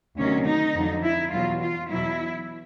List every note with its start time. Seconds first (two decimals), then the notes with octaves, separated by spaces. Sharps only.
0.17 D2 C3 D#3 F#3 C#4
0.46 D#4
0.74 F2 D3 F#3
1.03 E4
1.32 E2 B2 F#3 F4
1.61 F4
1.89 E2 B2 F#3 E4